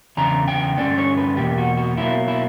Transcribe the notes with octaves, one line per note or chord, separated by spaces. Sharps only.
E2 C#3 D4 A#5
G5
G2 D3 G3 C#4 D5
C#5
B4
E2 B2 A#3 G4
F#4
F#4
B2 F#3 A#3 E4
E4